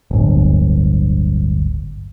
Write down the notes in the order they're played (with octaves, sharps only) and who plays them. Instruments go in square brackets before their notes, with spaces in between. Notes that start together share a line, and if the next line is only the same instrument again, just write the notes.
[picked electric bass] D1 G1